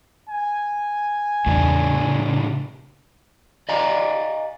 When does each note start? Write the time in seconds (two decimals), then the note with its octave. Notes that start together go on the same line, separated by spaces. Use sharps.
0.29 G#5
1.46 E2 A2 C#3 G3 D4
3.69 D5 D#5 F5 G#5 A#5